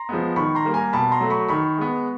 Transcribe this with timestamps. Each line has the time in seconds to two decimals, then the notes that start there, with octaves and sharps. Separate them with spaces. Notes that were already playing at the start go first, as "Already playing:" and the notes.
Already playing: A#5 C6
0.09 F3 G#3 B3
0.36 D#3 B5 C#6
0.55 A#5 C6
0.65 G3 A#3
0.74 G#5 A#5
0.93 B2 A5 B5
1.12 A#5 C6
1.21 F#3 A3
1.30 B5 C#6
1.48 D#3 B5 C#6
1.77 G#3 B3